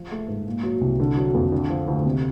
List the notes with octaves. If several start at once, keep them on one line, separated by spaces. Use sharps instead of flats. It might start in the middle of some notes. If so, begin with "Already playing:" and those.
Already playing: F3
A3
G#2
A#2
F#3
C2
D3
F#3
F2
D3
F3
D2
C3